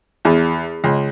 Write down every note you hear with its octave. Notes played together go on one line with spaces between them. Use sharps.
E2
C#2